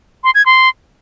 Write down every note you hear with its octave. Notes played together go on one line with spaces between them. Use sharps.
C6
G#6
C6